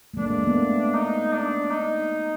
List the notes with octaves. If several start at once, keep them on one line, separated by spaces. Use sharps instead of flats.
A3
G#3 A#3 D4
A#3
A3 B3
D#4
D4
D#4